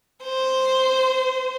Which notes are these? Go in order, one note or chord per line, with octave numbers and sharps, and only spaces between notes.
C5